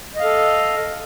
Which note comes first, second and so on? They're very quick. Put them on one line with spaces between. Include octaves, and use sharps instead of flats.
D#5 F5 A4